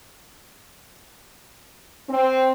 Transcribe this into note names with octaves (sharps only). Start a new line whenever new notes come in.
C4